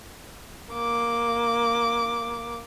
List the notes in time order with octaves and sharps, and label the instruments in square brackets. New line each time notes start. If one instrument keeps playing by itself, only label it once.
[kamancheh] A#3 D6